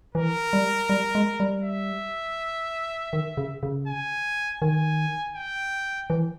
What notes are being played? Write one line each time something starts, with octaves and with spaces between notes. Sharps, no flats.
E3 A#4
G3
G3
G#3
G3
E5
D#3
C#3
C#3
G#5
D#3 G#5
G5
E3